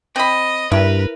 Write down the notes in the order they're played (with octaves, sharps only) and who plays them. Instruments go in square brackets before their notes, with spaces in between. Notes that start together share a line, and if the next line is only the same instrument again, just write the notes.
[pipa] C4 B5 [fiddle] D#5
[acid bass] G2 [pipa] E4 [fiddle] A#4 B4